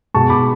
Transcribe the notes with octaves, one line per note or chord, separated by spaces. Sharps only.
B2 G#3 A5 C#6
B5 D6